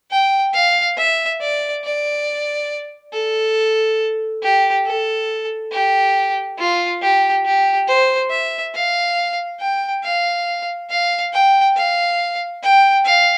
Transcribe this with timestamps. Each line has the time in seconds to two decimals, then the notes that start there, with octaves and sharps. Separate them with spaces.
0.11 G5
0.53 F5
0.97 E5
1.41 D5
1.84 D5
3.13 A4
4.42 G4
4.85 A4
5.72 G4
6.58 F4
7.01 G4
7.45 G4
7.88 C5
8.30 E5
8.74 F5
9.60 G5
10.04 F5
10.90 F5
11.33 G5
11.76 F5
12.62 G5
13.05 F5